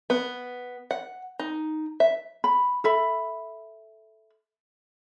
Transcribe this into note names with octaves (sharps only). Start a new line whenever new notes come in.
B3
F#5
D#4
E5
B5
A4 E5 B5